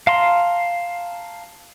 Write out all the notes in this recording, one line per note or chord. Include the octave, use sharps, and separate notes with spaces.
F5 A5 A#5 C6